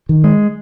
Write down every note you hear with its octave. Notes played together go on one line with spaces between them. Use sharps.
D#3
G#3